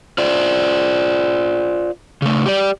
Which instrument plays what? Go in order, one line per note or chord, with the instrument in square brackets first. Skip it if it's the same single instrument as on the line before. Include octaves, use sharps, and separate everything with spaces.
[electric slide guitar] F4 C5 D5
C#3 A3
G4 D5